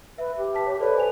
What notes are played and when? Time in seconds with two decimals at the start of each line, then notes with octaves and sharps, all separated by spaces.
0.18 B4 E5
0.38 G4
0.54 B4 A5 B6
0.67 C#5
0.80 A4 B4 C5 D5
0.97 G#5 F7